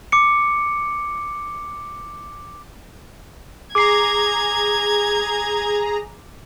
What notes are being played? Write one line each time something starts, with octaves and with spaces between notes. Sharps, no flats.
D6 C#7
G#4 A#5 D6 G#6 C7